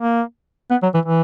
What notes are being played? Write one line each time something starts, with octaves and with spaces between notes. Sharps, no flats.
A#3
B3
F#3
E3
E3